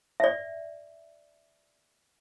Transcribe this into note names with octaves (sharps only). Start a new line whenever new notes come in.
D5 E5